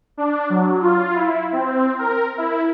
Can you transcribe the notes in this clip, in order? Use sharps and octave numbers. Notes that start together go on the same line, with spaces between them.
D4
F#3
F4
E4
C4
A#4
E4